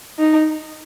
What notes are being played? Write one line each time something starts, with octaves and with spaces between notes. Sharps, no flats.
D#4